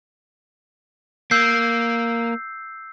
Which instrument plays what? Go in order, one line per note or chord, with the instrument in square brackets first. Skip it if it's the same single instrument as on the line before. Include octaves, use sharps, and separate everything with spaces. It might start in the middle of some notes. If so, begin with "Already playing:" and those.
[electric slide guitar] A#3 [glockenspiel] E6 G6 C7